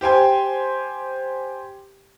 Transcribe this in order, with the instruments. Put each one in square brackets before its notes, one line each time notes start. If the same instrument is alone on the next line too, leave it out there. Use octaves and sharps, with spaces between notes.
[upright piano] G4 C5 G5 G#5